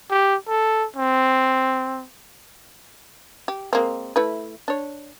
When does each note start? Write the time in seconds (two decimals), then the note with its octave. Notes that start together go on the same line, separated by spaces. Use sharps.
0.11 G4
0.48 A4
0.97 C4
3.48 G4
3.73 G#3 A#3 C4
4.16 A3 E4 B4
4.68 D4 C#5